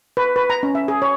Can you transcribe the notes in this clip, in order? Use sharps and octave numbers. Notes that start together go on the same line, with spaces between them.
B4
B4
A#5
C#4
E5
G#4
C#5